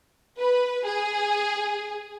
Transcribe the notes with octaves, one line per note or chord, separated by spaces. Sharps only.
B4
G#4